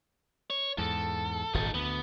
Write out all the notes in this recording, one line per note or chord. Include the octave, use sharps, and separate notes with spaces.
C#5
E2 G#2 A4
D#1 G#1 D#2 D#4 A4
D2 B3